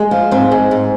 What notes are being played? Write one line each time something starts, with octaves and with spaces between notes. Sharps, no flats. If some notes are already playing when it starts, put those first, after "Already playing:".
Already playing: G#3
F3
G#2 C4
G#3
G#2